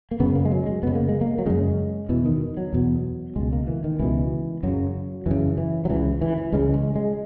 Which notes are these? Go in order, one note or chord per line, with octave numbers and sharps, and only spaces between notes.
A#3
F#2 C#3 B3
A#3
G#3
F#3
G#3
F#2 C#3 B3
A#3
G#3
A#3
F#3
F#2 C#3 G#3
E2 B2 E3
D#3
F#3
E2 B2
C#2 B2 G#3
A#3
E3
D#3
C#2 B2 E3
F#2 C#3 F#3
F#2 C#3 E3
E3
F#3
C#2 C#3 E3
E3
E3
C#2 C#3 G#3
G#3
G#3